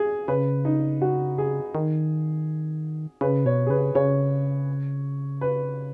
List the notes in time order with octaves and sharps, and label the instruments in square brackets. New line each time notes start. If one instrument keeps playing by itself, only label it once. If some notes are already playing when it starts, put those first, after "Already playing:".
Already playing: [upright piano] G#4
[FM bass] C#3 [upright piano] B4
[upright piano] D#4
F#4
G#4
[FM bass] D#3
[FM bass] C#3 [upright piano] B4
[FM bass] B2 [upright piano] C#5
[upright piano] G#4
[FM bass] C#3 [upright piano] B4
[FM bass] C#3 [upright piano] C#5
[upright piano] B4